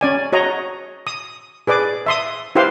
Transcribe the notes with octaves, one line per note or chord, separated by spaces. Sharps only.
C#4 D5 G#5
F#4 C#5 D#5 A#5
D#6
G#4 B4 D5 D6
E5 C6 D#6
E4 G4 B4 C5 F5 C6